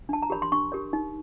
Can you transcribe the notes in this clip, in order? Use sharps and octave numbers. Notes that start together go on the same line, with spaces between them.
D4 A5
A#5
G4 A#4 C#5 B5
C6
D4 C#6
G4 A#4 C#5
D#4